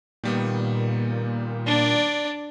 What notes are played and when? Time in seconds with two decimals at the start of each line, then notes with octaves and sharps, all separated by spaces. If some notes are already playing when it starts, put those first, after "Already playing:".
0.24 A#2 D#3 G3 B3
1.66 D4 D5